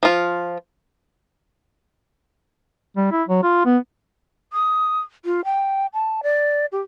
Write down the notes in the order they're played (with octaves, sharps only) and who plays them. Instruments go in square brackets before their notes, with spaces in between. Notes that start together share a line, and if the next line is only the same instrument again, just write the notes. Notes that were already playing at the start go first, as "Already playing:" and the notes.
[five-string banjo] F3 F4
[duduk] G3
E4
F#3
F4
B3
[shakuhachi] D#6
F4
G5
A5
D5
G4